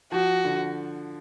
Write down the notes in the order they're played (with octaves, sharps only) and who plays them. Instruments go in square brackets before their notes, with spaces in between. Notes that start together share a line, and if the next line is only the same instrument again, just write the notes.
[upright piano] F3 [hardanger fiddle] F#4
[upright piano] D3